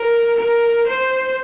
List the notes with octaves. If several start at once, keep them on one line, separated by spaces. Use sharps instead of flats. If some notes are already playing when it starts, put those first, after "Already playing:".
Already playing: A#4
A#4
C5